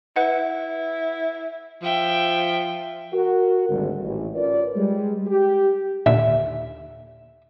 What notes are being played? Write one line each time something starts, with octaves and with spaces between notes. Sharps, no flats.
E4 B4 F#5
F3 E5 G5
F#4 A#4
G#1 D2 G3
A1
C#4 F4 A#4 B4 C#5 D5
G3 G#3
G4
D#2 A#2 D3 E5